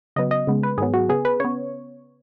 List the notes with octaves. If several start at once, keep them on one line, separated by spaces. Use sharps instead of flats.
C#3 F#3 B3 D#5
D#5
C#3 G#3 B3
B4
G#2 D#3 F#3 B3 G#4
F#4
C#3 B3 G#4
B4
C#3 B3 C#5